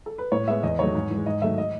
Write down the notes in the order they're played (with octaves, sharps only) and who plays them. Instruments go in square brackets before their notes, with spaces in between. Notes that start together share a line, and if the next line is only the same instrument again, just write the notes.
[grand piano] A4
B4
A2 C#5
G#3 B3 E5
E2 D#5
D#3 F#3 A3 C#5
G#2
E3 G#3
G#2 D#5
D#3 F#3 A3 E5
D#5